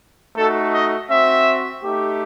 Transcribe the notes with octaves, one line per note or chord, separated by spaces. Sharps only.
A3 D#4 F#4 A4
D#5
C4 F#4 E5
A3 D#4 G4